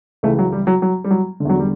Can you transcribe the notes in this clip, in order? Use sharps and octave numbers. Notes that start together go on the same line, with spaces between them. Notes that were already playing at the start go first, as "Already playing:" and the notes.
C#2 C#3 E3 A3
F#3
G3
F#3
F#3
G3
F#3
D3
E2 F#3
G3